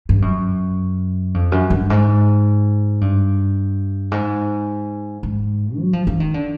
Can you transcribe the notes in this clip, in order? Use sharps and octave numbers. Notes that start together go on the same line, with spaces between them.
G2
F#2
F2
F#2
G2
G#2
G2
G#2
G#2
F#3
F3
E3
D#3
D3